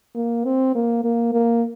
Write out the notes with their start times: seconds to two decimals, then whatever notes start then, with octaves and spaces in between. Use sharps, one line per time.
0.15 A#3
0.44 C4
0.75 A#3
1.04 A#3
1.33 A#3